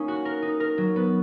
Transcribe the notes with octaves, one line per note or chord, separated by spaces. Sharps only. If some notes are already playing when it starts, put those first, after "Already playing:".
Already playing: A#3 C#4 D#4
F#4
A#4
D#4
A#4
F#3
B3